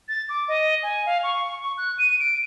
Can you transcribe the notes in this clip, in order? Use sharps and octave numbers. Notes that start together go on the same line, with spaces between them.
A6
D6
D#5
G#5
F5
C#6
C#6
F#6
D#7
D7